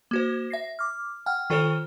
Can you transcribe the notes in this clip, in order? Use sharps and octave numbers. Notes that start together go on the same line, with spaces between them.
A#3 F#4 C5
E5 A#6 C7
D6 F6
F#5 G5 F6
D#3 F4 A4 C5 C#5 F6